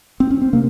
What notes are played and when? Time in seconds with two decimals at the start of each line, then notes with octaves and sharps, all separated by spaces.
0.20 C4
0.31 C#4
0.42 C4
0.53 C3 A#3